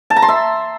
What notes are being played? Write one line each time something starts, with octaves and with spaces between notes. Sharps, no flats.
A5
A#5
C6
E5